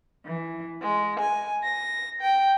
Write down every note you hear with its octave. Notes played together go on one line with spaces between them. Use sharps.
E3
G#3
G#5
A#6
G5